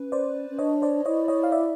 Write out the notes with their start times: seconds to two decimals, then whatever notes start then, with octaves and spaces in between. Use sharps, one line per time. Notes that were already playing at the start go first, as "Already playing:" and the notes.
Already playing: C#4 B4
0.12 C5 D5
0.50 C#4
0.59 D4 C#5 D#5
0.82 C5 D5
1.06 E4 C#5 D#5
1.28 C#5 D#5
1.43 F5
1.52 D5 E5